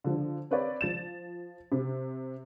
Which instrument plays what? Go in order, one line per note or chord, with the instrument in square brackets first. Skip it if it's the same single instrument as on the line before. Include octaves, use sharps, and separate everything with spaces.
[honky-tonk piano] D3 F3
C4 B4 C#5 D5
F3 A6 E7
C3